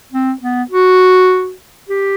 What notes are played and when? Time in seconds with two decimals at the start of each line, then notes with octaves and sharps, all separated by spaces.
0.12 C4
0.42 B3
0.71 F#4
1.89 G4